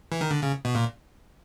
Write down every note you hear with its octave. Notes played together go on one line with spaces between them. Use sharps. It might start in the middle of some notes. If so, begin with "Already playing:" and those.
E3
D#3
D3
C#3
B2
A#2